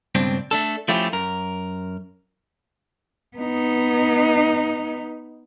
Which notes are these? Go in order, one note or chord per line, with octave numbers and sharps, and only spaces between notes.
C#2 G2 B2 C4 D4
A3 D4 A4
F3 A3 C#4 E4 F4 G4
F#2 A#4
B3 D#4